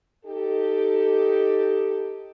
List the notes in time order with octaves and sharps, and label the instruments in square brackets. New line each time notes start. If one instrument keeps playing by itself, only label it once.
[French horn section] D#4 G4 A4